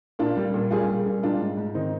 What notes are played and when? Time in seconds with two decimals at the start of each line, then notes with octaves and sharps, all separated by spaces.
0.19 A#2 D4 F4
0.37 G3
0.54 A#2
0.71 G3 F4 G#4
0.88 A#2
1.06 G3
1.23 G#3 D4 F4
1.40 G#2
1.57 G#2
1.75 D#3 C4 D#4